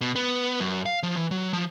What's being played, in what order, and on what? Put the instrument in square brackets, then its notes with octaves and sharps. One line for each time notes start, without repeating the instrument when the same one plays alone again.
[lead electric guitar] B2
B3
F#2
F5
F3
E3
F#3
F3